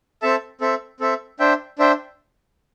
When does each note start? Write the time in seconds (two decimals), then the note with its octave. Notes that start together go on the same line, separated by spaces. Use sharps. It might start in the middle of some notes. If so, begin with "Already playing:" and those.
0.22 C4 A4 E5 A5
0.61 C4 A4 E5
1.00 C4 A4 E5
1.39 D4 C5 E5 G5
1.79 D4 C5 E5 G5